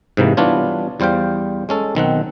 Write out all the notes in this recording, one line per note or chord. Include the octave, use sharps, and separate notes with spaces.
G#2 C3 E3 A#3
E3 G3 B3 D4 F4 C#5
E2 G3 C5 F5 G5
G#3 C#4 A4
B1 D#3 C4 F#5